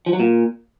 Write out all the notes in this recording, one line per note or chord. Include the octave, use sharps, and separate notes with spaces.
F3
F#3
A#2